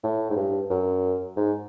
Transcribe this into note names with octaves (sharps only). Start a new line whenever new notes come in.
A2
G#2
G2
F#2
G#2